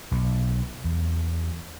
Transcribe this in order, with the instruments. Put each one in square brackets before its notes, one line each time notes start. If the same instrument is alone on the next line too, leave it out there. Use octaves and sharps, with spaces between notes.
[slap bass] B1
E2